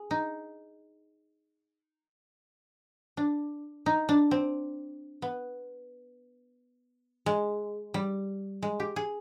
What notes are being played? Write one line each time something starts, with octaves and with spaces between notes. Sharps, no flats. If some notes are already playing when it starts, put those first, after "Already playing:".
Already playing: G#4
D#4
D4
D#4
D4
C4
B3
G#3
G3
G#3
G4
G#4